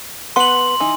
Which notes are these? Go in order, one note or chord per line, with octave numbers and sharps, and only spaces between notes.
B3 B4 F#5 C6 F#7
E3 D#4